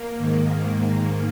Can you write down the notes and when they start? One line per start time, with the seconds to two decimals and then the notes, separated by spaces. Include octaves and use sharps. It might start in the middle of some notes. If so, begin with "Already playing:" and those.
Already playing: A#3
0.18 G#2 D#3
0.78 A#3